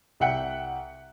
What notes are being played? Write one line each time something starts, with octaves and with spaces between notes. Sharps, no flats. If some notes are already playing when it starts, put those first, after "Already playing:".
C2 E5 F#5 G5 C#7